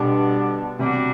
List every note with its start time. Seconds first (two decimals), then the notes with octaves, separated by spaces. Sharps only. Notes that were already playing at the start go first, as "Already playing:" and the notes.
Already playing: B2 D3 G3 B3 D4
0.79 C3 G3 D4 F#4